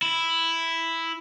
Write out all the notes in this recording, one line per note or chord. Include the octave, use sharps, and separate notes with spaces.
E4